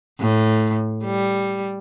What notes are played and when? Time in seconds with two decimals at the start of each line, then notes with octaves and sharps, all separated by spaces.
0.20 A2
1.04 G3